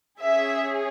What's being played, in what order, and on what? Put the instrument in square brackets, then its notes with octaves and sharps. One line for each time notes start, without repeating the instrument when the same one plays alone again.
[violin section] C#4 G#4 E5